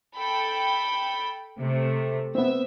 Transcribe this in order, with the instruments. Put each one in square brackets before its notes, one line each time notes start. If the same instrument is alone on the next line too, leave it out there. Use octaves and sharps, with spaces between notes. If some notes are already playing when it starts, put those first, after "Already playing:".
[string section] A4 G5 B5
C3 A3
[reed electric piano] B3 C4 [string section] E5